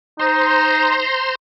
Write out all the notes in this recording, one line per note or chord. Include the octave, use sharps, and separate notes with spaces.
D#4 C5 A#5 C6